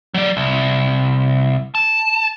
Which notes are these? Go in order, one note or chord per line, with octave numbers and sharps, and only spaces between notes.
F#3 D5
C2
A5